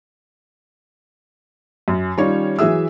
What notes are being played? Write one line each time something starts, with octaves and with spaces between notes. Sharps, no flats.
F#2
D#3 G3 C#4 F4 C#5
E3 F#3 G#4 E5 E6